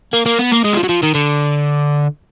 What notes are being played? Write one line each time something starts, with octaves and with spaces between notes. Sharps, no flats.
A#3
A#3
B3
A#3
G#3
F#3
F3
F#3
F3
D#3
D3